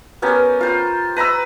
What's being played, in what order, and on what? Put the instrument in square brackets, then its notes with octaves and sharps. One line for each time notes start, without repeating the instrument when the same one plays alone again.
[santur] B3 C#4 G4 A#4
F4 C5
B4 A#5 B5 E6